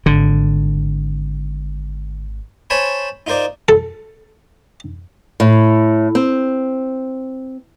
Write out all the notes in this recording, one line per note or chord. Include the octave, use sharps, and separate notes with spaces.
G#1 D3
C5 C#5 G#5 A5 B5
D#4 F4 A#4 C5 D5
A4
A2
C4